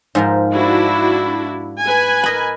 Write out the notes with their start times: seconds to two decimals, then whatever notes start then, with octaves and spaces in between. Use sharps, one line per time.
0.15 G#2 F3 A#4
0.53 D4 E4 F#4
1.83 B4 G#5
2.24 A#4 D#5 B5